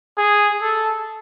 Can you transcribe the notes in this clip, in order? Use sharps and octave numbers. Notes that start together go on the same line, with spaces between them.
G#4
A4